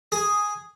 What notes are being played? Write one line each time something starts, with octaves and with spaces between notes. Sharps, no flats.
G#4